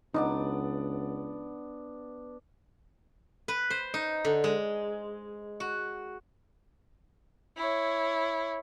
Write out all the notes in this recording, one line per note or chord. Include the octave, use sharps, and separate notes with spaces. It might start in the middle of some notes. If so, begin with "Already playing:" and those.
C#2 B3 D4 D#4 F#5
B4
C5
D#4
D3
G#3
F#4
E4 C#5